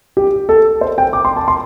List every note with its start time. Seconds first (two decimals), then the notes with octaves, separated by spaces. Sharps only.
0.17 G4
0.49 A4
0.81 C5
0.98 G5
1.13 D6
1.25 C6
1.36 A5
1.48 C6